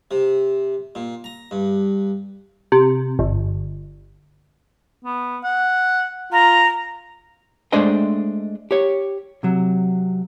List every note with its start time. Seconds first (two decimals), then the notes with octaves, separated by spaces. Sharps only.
0.11 C3
0.95 A#2
1.24 A#5
1.51 G2
2.72 C3
3.19 G1
5.05 B3
5.44 F#5
6.32 F4 A#5
7.72 G#3 A3 D4 C5 D#5 G5
8.71 G4 C#5
9.43 C3 F#3